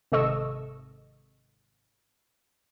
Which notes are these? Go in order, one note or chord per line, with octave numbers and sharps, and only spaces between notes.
G#1 C3 A4 D#5 C#6 E6